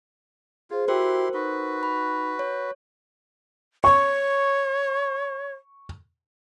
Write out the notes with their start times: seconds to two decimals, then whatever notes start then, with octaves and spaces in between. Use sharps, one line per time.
0.71 F4 G#4 C5
0.88 E4 F#4 G4 A#4 C5 G5 C6
1.34 D#4 F#4 B4
1.83 B5
2.39 C#5
3.84 C#5 C#6